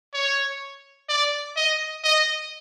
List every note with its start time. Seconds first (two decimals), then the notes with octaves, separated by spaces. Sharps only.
0.14 C#5
1.09 D5
1.56 D#5
2.04 D#5